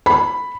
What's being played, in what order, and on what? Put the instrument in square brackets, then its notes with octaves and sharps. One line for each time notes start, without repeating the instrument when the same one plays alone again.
[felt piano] B5